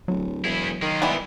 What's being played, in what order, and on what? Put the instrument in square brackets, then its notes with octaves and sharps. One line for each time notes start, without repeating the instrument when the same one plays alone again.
[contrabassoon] D1 [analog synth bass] F#3
[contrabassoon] E1 [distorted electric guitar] E4 G#4
[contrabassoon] D#3 [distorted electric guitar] G#3 F4
[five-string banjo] E3 G3 B3